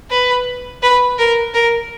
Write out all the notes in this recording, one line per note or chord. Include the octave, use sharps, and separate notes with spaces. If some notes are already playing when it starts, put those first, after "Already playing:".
B4
B4
A#4
A#4